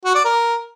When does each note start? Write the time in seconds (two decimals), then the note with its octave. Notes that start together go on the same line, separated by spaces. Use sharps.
0.04 F#4
0.15 D5
0.25 A#4